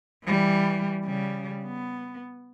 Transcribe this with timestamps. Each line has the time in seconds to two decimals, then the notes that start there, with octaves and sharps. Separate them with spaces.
0.24 E3 G3
1.05 C#3 G3
1.65 B3